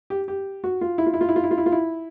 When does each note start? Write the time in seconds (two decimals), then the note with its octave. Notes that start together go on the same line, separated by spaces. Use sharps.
0.10 G4
0.28 G4
0.64 F#4
0.81 F4
0.98 E4
1.06 F4
1.14 E4
1.21 F4
1.29 E4
1.36 F4
1.44 E4
1.51 F4
1.58 E4
1.66 F4
1.72 E4